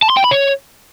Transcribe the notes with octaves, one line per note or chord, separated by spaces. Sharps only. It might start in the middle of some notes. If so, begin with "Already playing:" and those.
A5
C6
G5
B5
C#5